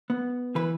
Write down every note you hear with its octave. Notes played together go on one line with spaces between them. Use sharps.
B3
E3 B4